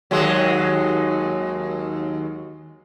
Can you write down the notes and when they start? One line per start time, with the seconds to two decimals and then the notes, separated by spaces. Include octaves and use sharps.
0.11 D#2 F#3 G#3